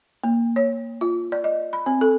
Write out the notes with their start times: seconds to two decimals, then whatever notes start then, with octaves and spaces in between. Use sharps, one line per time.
0.24 A#3
0.56 C#5
1.01 F4
1.32 D5
1.44 D#5
1.73 B5
1.86 C4
2.01 A4